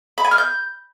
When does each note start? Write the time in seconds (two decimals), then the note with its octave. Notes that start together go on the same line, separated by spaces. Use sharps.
0.18 B5
0.24 G#5
0.31 F6
0.38 G6